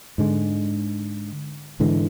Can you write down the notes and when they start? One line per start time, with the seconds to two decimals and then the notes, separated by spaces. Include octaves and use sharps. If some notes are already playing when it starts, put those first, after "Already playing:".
0.18 G#2 D3 G#3
1.80 G#2 D3 E3 G#3